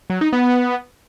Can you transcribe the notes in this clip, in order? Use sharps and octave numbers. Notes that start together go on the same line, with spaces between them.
F#3
D#4
B3